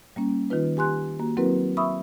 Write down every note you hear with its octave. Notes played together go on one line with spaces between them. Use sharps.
G3 A#3 C#4
D#3 D#4 F4 B4
G4 G#5 C6 F#6
A#3 F#4
F#3 C4 E4 F#4 A#4 B4
E5 B5 C#6 D#6 E6